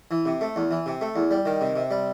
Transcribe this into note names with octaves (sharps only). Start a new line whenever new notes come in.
E3
C3
A3
E2
E3
C3
A3
E2
G3
D#3
C3
C3
G3